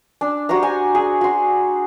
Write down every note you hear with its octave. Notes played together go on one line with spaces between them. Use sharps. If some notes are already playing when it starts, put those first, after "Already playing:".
D4
F#4 G4 C5 A#5
G#5
G#4
F#4 C6